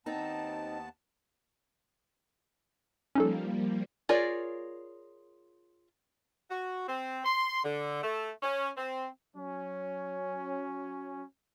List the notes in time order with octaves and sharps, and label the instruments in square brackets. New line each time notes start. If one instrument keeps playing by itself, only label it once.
[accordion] D#2 B3 A5 [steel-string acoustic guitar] C4 D#4
[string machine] F3 G3 A#3 [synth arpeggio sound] C#4 D#4 A4
[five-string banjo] F4 G#4 A#4 C#5 D5
[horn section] F#4
C4
C6
D3
A3
C#4
C4
F#3 C#4